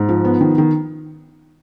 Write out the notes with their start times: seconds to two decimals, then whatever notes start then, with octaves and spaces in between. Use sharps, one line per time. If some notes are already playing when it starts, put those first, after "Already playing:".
Already playing: G#2
0.09 F3
0.25 B3
0.41 D#3
0.58 D#3